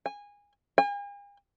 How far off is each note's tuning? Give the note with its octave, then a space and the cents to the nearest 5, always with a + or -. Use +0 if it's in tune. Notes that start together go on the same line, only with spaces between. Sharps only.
G#5 -20
G#5 -45